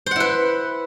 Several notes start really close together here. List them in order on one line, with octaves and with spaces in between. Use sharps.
C5 F#5 E4 B4